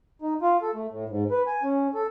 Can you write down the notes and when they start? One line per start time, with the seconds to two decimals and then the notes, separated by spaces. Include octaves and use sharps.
0.22 D#4
0.42 F4
0.62 A4
0.74 A3
0.91 A2
1.10 G#2
1.31 B4
1.47 G#5
1.63 C#4
1.94 A4